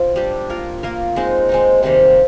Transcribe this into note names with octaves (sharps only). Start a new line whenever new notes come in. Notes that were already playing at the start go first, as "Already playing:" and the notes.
Already playing: C4 F4
G3 D4 G4
A#3 F4 A#4
A#3 F4 A#4
G#3 C4 D#4
G#3 C4 D#4
C3 D#3 G3 A#3